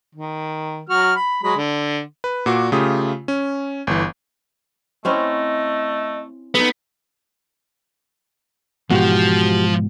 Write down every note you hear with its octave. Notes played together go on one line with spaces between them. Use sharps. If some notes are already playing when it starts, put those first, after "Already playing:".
D#3
F#3 F#4 F6
B5
F#3 G#3 B5
D3
B4
A#2 F#4 D6
C#3 A3 F4 G4 D#6
C#4
G1 E3
A3 C4 C#4 E4 D#5
B3 D#4 G#4 A4
G#2 B2 E3 F3 F#4 G4